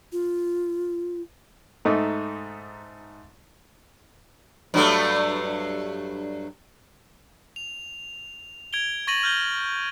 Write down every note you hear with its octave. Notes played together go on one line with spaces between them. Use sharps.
F4
G#2 A3 D#4
G2 F#3 A3
F7
G#6 D7 F7 G7
C#6 A6 A#6 D#7 F#7
F6 G6 G7